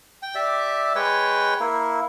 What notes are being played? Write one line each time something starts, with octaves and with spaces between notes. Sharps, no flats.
G5
G4 D5 E5
G#3 B4 C#5 G5
A#3 E4